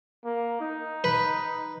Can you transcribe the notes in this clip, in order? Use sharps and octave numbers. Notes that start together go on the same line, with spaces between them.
A#3
D#4
B4